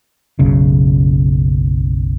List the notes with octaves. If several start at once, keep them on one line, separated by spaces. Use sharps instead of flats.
F#1 B1 C#3